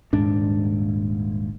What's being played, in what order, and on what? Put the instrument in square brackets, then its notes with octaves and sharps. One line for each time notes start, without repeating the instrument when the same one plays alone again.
[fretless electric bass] D#1 G#2 D4